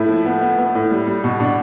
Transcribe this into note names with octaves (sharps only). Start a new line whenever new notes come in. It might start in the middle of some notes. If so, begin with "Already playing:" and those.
Already playing: A2 A3 E4
F3
B3
B3
B3
A2
G3
G3
B2
B2 D4